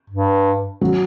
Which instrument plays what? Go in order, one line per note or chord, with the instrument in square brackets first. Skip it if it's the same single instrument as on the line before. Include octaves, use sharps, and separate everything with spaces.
[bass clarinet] G2
[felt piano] F#3